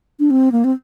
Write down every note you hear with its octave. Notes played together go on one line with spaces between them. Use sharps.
D4
C4
A#3
C4